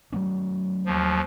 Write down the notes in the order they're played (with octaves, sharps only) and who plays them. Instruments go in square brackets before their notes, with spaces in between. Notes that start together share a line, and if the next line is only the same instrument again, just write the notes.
[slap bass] F#3 A3 C#4
[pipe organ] D#2 F3